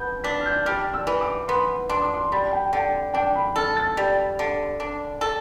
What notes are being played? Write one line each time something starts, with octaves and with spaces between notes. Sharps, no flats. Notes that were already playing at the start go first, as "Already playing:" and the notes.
Already playing: B3 G6
D4 B6
F6
G6
G3 F6
E6
E3
D6
B3 C6
D4 C6
D6
C6
G3 B5
G5
D3 G5
D4 G5
B5
A4 F6
A6
G3
D3
D4
A4